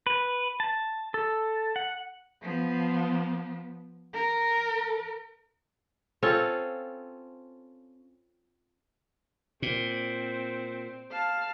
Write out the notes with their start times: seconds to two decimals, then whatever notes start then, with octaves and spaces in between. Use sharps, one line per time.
0.07 B4
0.60 A5
1.14 A4
1.76 F#5
2.42 F3 B3
4.14 A#4
6.23 C4 C#4 F4 A4
9.62 A#2 C4
11.11 F5 A5